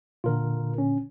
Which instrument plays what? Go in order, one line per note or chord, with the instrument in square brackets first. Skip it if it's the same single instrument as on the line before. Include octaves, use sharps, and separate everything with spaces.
[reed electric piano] A#2 D3 [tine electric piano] F4 A#4
[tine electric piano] C#4